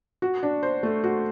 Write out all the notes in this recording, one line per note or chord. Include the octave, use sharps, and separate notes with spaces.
F#4
D4
C5
A3
F#4